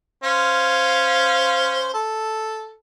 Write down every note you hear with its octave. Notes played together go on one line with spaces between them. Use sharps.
C#4 C5 F5
A4